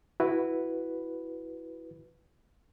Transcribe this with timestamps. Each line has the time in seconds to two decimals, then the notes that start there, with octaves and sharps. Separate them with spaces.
0.20 E4 F#4 B4